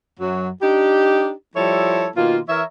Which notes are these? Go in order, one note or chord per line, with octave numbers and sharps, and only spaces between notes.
F#2 F#3
D4 D#4 G4
F3 G3 E4 A4 C#5
B2 D#3 A#3 F4
E3 A#4 C#5 E5